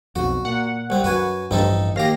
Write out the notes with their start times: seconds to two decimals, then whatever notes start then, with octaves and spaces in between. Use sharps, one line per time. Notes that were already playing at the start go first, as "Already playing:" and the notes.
0.16 B1 F2 F#4
0.45 A#2 F#5
0.90 C2 C4
1.04 F#2 F#4 B4 G#5
1.51 A1 G2 F3 C4 D#4 A4
1.96 D#2 G4 F5 A#6